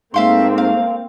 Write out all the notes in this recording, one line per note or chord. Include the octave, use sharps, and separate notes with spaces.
G#2 A3 A#3 C4 E5 F5 C6
F5